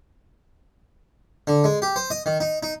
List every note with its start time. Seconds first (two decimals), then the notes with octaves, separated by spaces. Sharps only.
1.47 D3
1.64 G#3
1.82 G4
1.96 C5
2.10 D#5
2.26 D#3
2.40 D#4
2.63 D#4